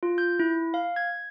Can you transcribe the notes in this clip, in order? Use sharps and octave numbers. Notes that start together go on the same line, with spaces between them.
F4
G6
E4
F5
G#6